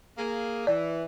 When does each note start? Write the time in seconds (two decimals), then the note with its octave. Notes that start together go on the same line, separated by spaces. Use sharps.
0.18 A#3 G#4
0.67 E3 D5